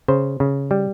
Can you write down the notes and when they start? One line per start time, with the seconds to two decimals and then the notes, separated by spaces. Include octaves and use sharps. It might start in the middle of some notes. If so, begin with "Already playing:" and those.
0.08 C#3 C5
0.40 C#3
0.71 G3